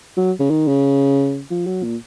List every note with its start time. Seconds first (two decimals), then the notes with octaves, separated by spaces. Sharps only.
0.17 F#3
0.40 C#3
0.50 D#3
0.68 C#3
1.50 F3
1.66 F#3
1.83 A#2